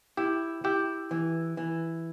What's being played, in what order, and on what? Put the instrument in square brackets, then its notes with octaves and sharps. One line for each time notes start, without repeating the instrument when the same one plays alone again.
[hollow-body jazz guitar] E4 [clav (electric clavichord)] G4
[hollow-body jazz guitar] E4 [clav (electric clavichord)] G4
[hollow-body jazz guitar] E3
E3